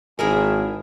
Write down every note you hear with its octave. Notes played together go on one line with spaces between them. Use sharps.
G#1 E4 G#4 A#4 G#5